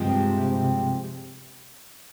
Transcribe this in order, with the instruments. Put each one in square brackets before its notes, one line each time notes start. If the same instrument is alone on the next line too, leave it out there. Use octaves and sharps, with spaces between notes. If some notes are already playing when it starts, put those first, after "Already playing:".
Already playing: [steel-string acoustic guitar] G2 F3 G#3 C4 G4 [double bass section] C3